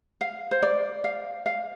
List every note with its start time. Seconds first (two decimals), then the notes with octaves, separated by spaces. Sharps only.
0.21 F5
0.51 C5
0.62 D5
1.04 F5
1.46 F5